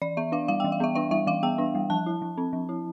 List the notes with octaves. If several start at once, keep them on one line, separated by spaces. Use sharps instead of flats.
E3 D5
B3 E5
D4 F5
G3 F5
E3 G5
F5
B3 E5
D4 E5
G3 E5
E3 F5
B3 G5
D4
G3
F3 A5
E4
F3
C4
F3
E4